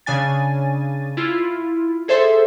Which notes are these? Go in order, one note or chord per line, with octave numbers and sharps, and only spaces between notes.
C#3 D4 G#5 A6
E4 F4
G#4 A4 C5 E5 C6